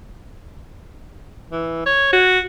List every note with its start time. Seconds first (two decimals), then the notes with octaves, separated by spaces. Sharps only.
1.51 E3
1.86 C#5
2.13 F#4